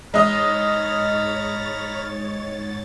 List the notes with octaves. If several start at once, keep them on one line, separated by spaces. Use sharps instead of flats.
G#2 G#3 C#5 D#5 A#5 B5 F6 A6